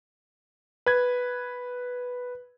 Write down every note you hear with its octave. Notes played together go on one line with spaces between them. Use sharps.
B4 G#6